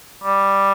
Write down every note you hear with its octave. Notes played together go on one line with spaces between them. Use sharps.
G3